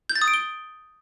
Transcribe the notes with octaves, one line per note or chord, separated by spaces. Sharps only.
G6
A6
D#6
D7
G7